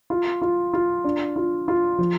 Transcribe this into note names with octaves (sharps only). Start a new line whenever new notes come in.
F4
F4
F4
D4
F4
F4
F3